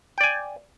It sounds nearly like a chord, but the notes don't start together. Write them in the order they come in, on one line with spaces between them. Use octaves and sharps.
G5 D5 G#5